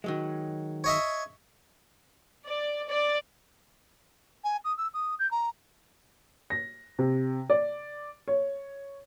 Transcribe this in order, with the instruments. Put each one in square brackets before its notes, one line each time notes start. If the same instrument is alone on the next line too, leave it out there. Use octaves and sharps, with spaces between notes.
[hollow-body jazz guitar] D#3 F#3 G#3
[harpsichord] C#5 D#5 E5
[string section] D5
D5
[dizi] G#5
D#6
E6
D#6
G6
A#5
[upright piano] A#6
C3
D5
C#5